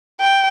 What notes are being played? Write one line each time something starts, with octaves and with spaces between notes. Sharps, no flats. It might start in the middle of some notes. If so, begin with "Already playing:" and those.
G5